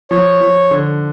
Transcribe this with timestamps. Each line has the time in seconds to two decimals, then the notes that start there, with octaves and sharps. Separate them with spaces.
0.11 F3 C#5
0.41 F3
0.71 D3